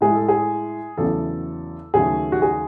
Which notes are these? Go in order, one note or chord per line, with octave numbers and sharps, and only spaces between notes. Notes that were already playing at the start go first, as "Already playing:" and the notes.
A2 G#3 G#4
A4
G#4
E2 C#3 F#3 A3 A4
D#2 C#3 F#3 A3 G#4
F#4
G#4